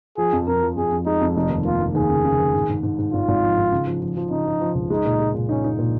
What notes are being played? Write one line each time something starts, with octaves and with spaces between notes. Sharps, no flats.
F3 G#4
F2
F2 A#4
F3
F2 G#4
F2
G#3 D#4
F2
F1 D#4
D#2
A#3 F4
D#2
D#2 G#4
C#3
C#3
D#2
G#2
G#2
G#2
G#2
G#1 F4
G#1
F3
G#2
C#3
F3
F3
F3
C#3 D#4
F3
F3
C#2
G#3 D#4
A#2
G#3
A#2
C#4 D#4
D#4
A#2